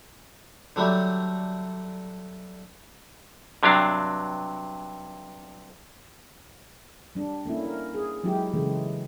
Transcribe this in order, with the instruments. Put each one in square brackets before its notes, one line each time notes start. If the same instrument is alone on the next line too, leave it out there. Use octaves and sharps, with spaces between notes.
[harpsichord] D3 F#3 G3 A3
[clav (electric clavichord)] G2 C3 F#3 D4 F5
[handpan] G3 D4
A3 A#3 C#4 E4
A#4
G#4
F#3 G#3 D#4 E4 G4
C#3 E3 G#3 A3